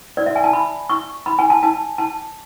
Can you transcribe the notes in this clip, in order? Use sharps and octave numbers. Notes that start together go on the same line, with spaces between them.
D5
E5
G#5
A5
B5
C#6
B5
G#5
A5
A5
A5